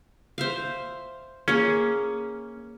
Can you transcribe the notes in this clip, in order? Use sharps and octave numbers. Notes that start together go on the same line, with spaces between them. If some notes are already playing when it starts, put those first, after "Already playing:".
C5 E5 F5
A#3 C#4 G#4